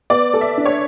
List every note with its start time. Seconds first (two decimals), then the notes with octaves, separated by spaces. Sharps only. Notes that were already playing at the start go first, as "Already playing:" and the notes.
0.10 B3 D5
0.34 A4
0.41 E5
0.58 D4
0.66 C#5